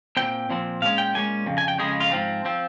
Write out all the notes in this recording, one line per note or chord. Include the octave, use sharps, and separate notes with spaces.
A#2 F3 C4 G5
A#2 F3 C4
A#2 G#3 C#4 F5
G5
A#2 G#3 C#4 G#5
F2 C#3
G#5
G5
F2 C#3 G#3 C#4 G#4
F4
G#2 F3 C4
F3 C4